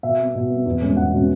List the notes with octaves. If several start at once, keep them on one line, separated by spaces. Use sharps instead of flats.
B2 E5
B3
B2
B3
E2
B2 G#3 C#4
E2 F#5
B2 G#3 C#4